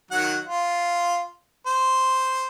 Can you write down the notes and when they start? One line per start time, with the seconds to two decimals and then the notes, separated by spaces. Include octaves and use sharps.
0.11 D#3 F#3 F#5
0.46 F4
1.67 C5